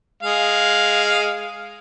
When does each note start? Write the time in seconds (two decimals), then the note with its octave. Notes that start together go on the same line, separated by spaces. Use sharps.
0.23 G#3 F5